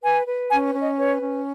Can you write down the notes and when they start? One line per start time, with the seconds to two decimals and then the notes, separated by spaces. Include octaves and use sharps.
0.02 B4 G#5
0.27 B4
0.50 C#4 G#5
0.74 C#4
0.81 D#5
0.97 B4 C#5
1.21 C#4